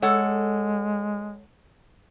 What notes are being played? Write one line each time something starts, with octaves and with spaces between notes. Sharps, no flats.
G#3 A4 C#5 F#5